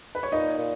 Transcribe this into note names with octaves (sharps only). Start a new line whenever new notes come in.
B4
C#5
A#2 D#4 D#5
A#2